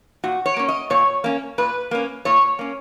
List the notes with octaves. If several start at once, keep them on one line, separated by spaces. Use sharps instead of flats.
A#2 F#4
C#5
A#3 C#4
D#5
A#2 C#5
A#3 C#4
A#2 B4
A#3 C#4
A#2 C#5
A#3 C#4